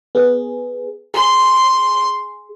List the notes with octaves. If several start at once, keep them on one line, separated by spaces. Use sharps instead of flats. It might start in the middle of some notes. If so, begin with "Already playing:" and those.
B3 G#4
G#4 C6